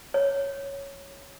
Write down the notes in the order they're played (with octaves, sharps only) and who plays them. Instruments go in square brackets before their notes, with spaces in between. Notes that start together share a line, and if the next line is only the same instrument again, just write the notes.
[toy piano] C#5